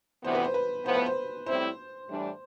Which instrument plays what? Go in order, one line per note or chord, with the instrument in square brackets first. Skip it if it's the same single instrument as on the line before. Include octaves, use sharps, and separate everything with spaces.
[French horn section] D2 C3 E3 B3 [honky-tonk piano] C5
[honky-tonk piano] B4
C5
B4
[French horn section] A2 F3 B3 [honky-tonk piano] C5
[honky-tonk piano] B4
C5
[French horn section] A2 G3 C4 E4 [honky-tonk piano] C5
[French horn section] A2 E3 G3 D4